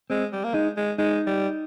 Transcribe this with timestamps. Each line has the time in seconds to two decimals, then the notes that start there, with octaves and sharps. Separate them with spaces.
0.10 G#3 C4
0.33 G3
0.44 A#3
0.54 G#3 D#4
0.77 G#3
0.98 G#3 D#4
1.27 G3